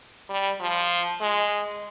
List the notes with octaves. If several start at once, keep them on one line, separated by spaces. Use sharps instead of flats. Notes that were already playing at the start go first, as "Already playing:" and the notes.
G3
F3
G#3